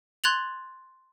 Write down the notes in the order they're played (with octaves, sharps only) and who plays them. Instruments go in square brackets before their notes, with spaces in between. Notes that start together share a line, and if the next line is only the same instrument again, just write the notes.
[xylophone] C6 F#6 G#6 A6 F7 F#7